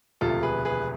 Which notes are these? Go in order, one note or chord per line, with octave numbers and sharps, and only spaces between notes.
E1 D2 C3 F3 F4 A4
G#4 B4
G#4 B4